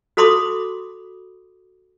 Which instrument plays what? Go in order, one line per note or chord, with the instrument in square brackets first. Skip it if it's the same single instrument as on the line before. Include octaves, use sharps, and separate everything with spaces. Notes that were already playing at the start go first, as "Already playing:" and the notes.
[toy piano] F#4 A4 B5 C6 D6 D#6